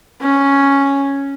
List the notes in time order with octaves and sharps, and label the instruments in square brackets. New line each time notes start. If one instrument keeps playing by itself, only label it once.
[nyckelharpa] C#4